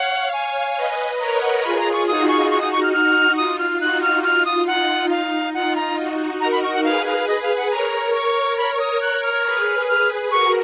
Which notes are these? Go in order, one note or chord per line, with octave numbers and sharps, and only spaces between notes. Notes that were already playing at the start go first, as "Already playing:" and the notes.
Already playing: C#5 F5 F#5
C#5 F5 G#5
B4 D#5
A#4 C#5 A#5
F#5
F4 G#4 B5
A#5
C#6
D#4 F#4 D#6
C#6
C#6
D#6
C#6
F6
F6
F4 D#6
F6
D#4 F#4 F#6
F6
F4 F6
D#6
D#4 F#5
F5
F4 F#5
A#5
D#4 F#4
F#4 A#4 A#5
B5
C#6
F#5
G#4 B4 F5
F5
G#4 B4 D#5
F5
F#5
A#4 C#5 A#5
A#4 C#5 C#6
B5
C#6
D#6
F#6
F6
G#4 B4
F6
F#4 A#4 C#6